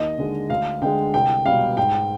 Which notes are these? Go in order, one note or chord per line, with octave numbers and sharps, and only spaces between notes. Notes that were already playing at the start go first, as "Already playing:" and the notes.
Already playing: D#2 D#5
D3 G#3
D2 F5
D3 G#3 G5
C2 G5
B2 G3 F5
G#2 G5